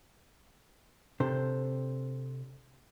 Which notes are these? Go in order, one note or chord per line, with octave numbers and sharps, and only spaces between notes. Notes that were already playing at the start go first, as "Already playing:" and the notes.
C3 D4 A4 C5